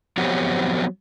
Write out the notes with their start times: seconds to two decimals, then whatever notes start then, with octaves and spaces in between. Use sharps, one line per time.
0.17 F3 F#3 B3 C4 G4 C#5